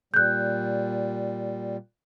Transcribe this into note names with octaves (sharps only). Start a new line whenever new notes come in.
A#2 G3 F#6 G6